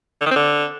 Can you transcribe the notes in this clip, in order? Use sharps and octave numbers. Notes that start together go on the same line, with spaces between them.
D3
D#3
C4
D3